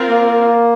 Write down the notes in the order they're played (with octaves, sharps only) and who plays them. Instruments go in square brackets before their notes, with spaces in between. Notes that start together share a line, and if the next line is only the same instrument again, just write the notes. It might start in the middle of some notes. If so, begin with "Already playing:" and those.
Already playing: [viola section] C4 F4 A#4
[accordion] A#3